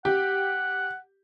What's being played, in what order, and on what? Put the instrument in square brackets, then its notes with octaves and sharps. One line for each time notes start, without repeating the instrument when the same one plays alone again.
[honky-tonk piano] G4 [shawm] F#5